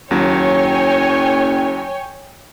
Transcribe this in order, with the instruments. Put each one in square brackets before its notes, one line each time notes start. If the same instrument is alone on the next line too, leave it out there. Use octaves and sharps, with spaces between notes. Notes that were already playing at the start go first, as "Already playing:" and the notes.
[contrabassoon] F#1 [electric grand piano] D#2 F#3 [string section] C#5 G5 G#5